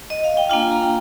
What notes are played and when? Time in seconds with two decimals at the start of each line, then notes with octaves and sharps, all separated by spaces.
0.10 D#5
0.24 F5
0.37 G5
0.49 A#3 D4 F4 F5 G#5
0.71 G5 A#5